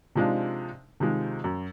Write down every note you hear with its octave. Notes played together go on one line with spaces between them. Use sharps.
C3 F3 G#3 D4 D#4 F4
C3 D#3 F3 G#3
F#2